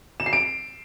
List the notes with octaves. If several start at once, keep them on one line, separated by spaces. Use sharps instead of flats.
E7
C7
D7